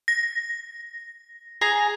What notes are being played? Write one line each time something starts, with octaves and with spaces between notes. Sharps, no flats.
A#6
G#4 G#5 A#5